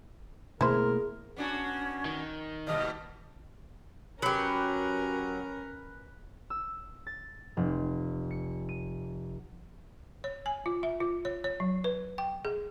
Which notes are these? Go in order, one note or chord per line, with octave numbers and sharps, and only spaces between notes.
B2 A3 A#3 E4 G#4 A#4 C5
B3 C#4 D4 F#4
D#3
D#2 B2 G3 D#5 F6
F#3 C#4 G4 A#4 B4
E6
A6
F1
C#7
D#7
C#5
G#5
F4
E5
F4
C#5
C#5
F#3
B4
G5
G#4